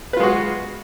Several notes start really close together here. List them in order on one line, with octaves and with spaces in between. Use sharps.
B4 F4 G#3 F#4